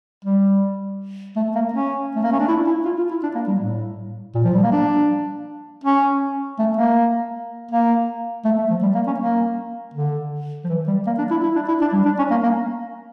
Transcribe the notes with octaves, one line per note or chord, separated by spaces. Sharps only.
G3
A3
A#3
C#4
A3
A#3
C#4
D4
E4
E4
F4
F4
E4
D4
A#3
G3
A2
A#2
F3
G3
A#3
D4
C#4
A3
A#3
A#3
A3
A3
F3
G3
A#3
C#4
A#3
D3
F3
E3
G3
A#3
D4
E4
E4
D4
E4
D4
G3
D4
C#4
A#3
A#3